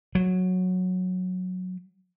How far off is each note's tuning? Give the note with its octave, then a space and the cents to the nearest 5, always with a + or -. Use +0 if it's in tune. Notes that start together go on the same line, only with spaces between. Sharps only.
F#3 -10